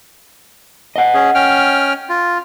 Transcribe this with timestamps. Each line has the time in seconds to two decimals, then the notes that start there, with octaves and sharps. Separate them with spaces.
0.96 D#5 F#5
1.14 C#4 G#4
1.35 C#4 G5 F6
2.10 F4